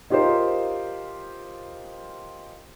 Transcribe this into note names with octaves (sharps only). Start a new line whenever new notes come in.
D#4 F4 G4 A#4 C5